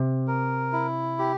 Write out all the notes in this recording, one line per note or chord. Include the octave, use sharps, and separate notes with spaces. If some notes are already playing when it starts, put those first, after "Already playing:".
Already playing: C3
A#4
E4
G4